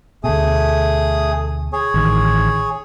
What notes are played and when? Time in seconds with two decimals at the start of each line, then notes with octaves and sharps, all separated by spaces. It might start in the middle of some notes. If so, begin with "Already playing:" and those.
0.24 D2 B2 A3 G#4 D#6
1.73 G#4 C#5
1.94 A1 D#3